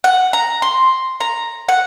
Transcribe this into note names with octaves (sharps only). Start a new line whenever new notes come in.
F#5
A#5
C6
A#5
F#5